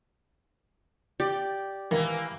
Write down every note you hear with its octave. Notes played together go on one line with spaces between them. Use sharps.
G4 D5
D#3 E3 A#3